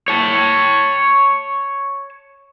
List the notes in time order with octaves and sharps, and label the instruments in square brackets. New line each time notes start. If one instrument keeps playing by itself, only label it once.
[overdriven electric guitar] C#5 A5